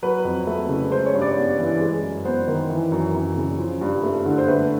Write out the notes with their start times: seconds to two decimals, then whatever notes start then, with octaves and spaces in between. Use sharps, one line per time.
0.02 F#3 B4
0.25 F2
0.47 A3
0.69 C#3
0.91 G#3 C5
1.06 C#5
1.14 G2
1.21 D5
1.36 B3
1.59 E3
1.80 G#3
2.03 F#2
2.25 B3 C5
2.47 D#3
2.70 E3
2.92 F#2
3.15 F#2
3.36 C#3
3.59 F3
3.81 G2
4.03 A3
4.25 D3
4.38 C5
4.48 A3 B4